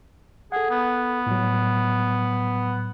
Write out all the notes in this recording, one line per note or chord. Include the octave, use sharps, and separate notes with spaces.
G#4 A4 F#5
B3
A2 F#3